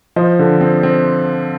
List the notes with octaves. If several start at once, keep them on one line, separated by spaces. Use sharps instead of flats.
F3 C5 D#5
D3
C4
C4